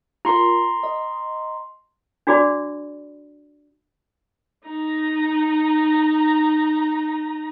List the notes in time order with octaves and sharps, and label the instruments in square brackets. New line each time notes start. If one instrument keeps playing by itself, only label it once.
[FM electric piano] F4 A#4 [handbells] A#5 C6
[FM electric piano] D#5
[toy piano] D4 F#4 G#4 D5 B5
[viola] D#4 A#5